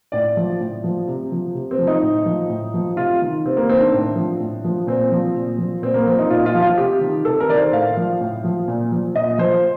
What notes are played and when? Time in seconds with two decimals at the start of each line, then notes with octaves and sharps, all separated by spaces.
0.12 A2 D5
0.37 F3
0.61 A2
0.84 F3
1.07 C3
1.32 F3
1.54 C3
1.71 C4
1.79 F3
1.87 D#4
2.03 A2
2.26 F3
2.49 A2
2.74 F3
2.97 C3 F4
3.22 D#3
3.45 C3 C4
3.57 A#3
3.69 D#3 C4
3.81 D4
3.93 A2
4.16 F3
4.40 A2
4.64 F3
4.87 A#2 C4
5.11 F3
5.35 A#2
5.58 F3
5.82 A#2 C4
5.94 A#3
6.06 F3 C4
6.19 D#4
6.30 A#2 F4
6.46 F4
6.55 F3
6.61 F4
6.78 C3 G4
7.01 D#3
7.25 C3 A4
7.40 A#4
7.49 D#3 D5
7.57 C5
7.72 A2 F5
7.97 F3
8.21 A2
8.44 F3
8.68 A#2
8.92 F3
9.15 A#2 D#5
9.38 F3 C5